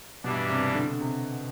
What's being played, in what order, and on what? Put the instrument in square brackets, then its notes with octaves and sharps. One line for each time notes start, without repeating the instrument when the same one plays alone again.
[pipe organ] G2 E3 G3 D4 [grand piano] B2
[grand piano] C3
D3
C3